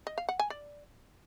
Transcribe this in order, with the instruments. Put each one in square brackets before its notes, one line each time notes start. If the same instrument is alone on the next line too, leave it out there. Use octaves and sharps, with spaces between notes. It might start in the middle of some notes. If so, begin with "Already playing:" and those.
[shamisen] D#5
F5
F#5
G#5
D5